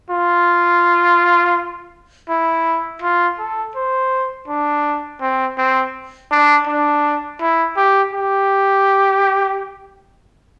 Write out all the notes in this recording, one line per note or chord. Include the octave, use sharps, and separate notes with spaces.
F4
E4
F4
A4
C5
D4
C4
C4
D4
D4
E4
G4
G4